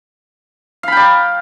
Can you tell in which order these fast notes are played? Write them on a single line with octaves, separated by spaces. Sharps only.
F5 B5 G5 D5